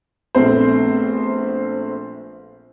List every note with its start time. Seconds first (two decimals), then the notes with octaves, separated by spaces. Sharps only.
0.35 A#1 A3 B3 C4 A4 C5